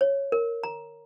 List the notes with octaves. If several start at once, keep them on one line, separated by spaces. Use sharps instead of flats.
C#5
A#4
A#5